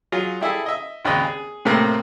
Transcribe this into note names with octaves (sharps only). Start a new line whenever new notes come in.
F#3 F4 G#4
G3 E4 G#4 A4
D#5 E5
G#1 D#2 C#3 D5 D#5 B5
G#4
A2 C3 A3 A#3 C4